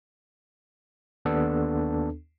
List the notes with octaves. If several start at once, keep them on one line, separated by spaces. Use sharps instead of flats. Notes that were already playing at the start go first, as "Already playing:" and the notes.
D#2 B3 D4 A4